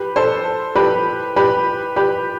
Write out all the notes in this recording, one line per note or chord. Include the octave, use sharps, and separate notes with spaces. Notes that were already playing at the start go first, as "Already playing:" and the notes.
Already playing: G4 B4
A4 C5
G4 B4
G4 B4
G4 B4